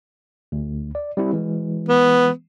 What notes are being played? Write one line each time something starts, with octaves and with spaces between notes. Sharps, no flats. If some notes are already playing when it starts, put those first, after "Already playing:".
D2
D5
G3 C4 E4
E3 G#3
B3